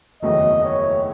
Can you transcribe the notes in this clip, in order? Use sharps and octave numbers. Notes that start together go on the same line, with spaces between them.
F#1 E2 D#3 F#3 A3 D#5
C#5